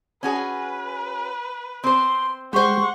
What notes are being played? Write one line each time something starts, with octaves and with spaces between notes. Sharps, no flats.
C#4 F#4 G#4 B4
C4 C5 C6
G#3 G4 C5 F#5 C6 C#6